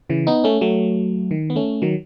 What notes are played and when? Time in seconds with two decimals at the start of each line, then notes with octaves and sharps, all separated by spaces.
0.10 C#3 E3
0.27 B3 D#4
0.44 A3 C#4
0.61 F#3 A3
1.31 D#3
1.50 B3
1.56 A3 C#4
1.82 D#3 F#3